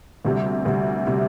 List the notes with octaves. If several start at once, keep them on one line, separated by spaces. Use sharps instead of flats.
D2 C3 G3
D2 C3 G3
C3 G3